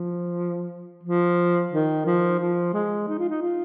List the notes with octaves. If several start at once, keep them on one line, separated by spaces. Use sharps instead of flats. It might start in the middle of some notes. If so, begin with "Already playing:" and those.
Already playing: F3
F3
D#3
F3
F3
G#3
D#4
F4
D#4
F4